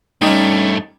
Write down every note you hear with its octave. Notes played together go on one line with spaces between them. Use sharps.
G2 G3 A3 C#4 D#4